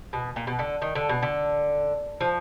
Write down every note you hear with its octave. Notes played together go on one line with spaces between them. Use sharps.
B2
A#2
B2
D3
D#3
D3
B2
D3
F3